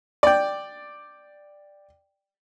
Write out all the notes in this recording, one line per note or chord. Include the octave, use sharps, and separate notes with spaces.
D5 G5